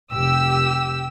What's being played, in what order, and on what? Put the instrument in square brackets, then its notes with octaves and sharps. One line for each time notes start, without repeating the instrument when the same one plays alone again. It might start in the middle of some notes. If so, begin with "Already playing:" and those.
[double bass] F1 [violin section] G4 E6